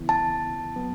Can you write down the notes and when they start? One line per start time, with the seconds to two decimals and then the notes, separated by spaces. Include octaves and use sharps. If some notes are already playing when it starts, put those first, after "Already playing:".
Already playing: C#3 E3 B3 E4
0.09 A5
0.76 F#3 B3